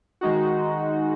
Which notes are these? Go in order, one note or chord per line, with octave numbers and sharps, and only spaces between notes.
D#3 G#3 D#4 F#4